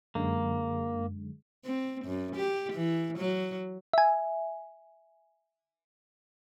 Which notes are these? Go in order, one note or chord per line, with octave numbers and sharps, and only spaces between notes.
F#2 D3 G#3 A#3
C4
F#2
G4
E3
F#3
E5 G#5